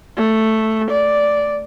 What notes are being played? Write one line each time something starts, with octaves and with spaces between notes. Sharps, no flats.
A3
D5